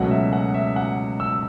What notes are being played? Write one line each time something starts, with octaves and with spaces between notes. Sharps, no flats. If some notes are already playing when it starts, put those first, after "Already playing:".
Already playing: C#2 B2 F#3 A3 F#5
E5
F#5
E5
F#5
E6